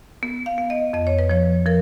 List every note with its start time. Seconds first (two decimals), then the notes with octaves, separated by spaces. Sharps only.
0.23 B3
0.46 F5
0.58 B3
0.70 D#5
0.93 F2 D#5
1.07 C#5
1.19 B4
1.30 F3 C#5
1.66 F3 A#4